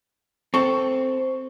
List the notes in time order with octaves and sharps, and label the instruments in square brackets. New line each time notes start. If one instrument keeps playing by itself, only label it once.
[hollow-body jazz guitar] C4 A4 [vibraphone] C5 [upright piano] C#6